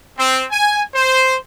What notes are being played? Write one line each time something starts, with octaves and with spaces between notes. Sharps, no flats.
C4
G#5
C5